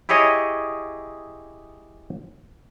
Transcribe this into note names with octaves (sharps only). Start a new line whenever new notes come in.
E4 G4 G#4 C#5 D#5